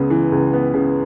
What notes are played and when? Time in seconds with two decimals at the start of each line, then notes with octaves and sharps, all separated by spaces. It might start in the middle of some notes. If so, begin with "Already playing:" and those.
Already playing: C#2 C#3 B3
0.10 E3
0.32 C#2
0.53 B3
0.74 C#3